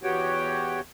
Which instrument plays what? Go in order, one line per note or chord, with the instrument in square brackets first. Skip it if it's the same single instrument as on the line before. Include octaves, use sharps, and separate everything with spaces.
[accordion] E2 B3 F#4 G4 C#5 G5